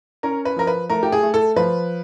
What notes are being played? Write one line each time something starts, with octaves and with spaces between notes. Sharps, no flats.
C#4 A#4
B4
F3 A#4
B4
A3 A#4
G4
G#4
A3
A4
F3 B4